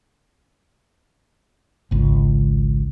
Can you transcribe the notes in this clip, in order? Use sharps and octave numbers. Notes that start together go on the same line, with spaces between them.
G#1 C#2